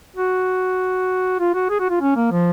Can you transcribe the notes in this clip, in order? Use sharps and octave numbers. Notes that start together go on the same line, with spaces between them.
F#4
F4
F#4
G#4
F#4
F4
C#4
A#3
F3